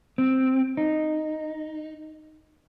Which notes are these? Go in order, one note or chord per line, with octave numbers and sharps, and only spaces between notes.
C4
D#4